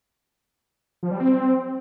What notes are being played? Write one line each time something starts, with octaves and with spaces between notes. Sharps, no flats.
F3
G3
C4